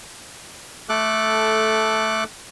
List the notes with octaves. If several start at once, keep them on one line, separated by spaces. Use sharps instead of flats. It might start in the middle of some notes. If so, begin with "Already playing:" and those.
A3 A4 D6 F#6